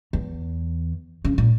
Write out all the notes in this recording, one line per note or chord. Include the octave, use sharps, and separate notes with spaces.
E2
C#3
A#2